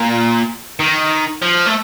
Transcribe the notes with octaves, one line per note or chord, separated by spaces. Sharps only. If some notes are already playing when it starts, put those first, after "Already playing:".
Already playing: A#2
D#3
F3
A3